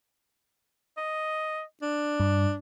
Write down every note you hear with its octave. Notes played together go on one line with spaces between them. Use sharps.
D#5
D4
G2